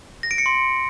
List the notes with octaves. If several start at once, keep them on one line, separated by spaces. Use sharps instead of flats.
A#6
D7
C#7
C6